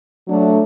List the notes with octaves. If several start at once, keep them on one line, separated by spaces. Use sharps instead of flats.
F#3 A3 D4